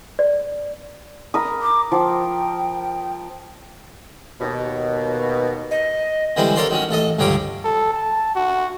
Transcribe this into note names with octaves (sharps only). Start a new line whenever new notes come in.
D5
A#4 B5 D#6
D6
F3 G5
D#2 B2
D#5
D3 E3 G3 G#3 C4 E4
A4 A#4 C#5 D5 F5 C6
D#3 F#3 C#4
A1 A4 D#5
C#2 G2 D3 G3 C#5 D6
A4
A5
F#4